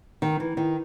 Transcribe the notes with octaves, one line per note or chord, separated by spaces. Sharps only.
D#3
E3
D#3